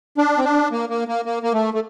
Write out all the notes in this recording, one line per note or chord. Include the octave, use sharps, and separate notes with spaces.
D4
C4
D4
A#3
A#3
A#3
A#3
A#3
A3
A3